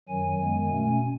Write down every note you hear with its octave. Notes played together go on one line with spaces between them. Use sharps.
F#2 D#3 F#3 G#5
F#2 D#3 G#3 B3
B2 A3 C#4